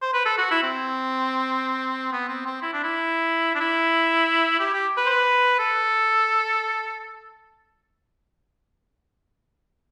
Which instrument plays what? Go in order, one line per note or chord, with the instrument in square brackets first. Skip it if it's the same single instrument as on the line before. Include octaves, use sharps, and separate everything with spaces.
[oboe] C5
B4
A4
F#4
E4
C4
B3
C4
C4
E4
D4
E4
D4
E4
G4
G4
B4
C5
B4
A4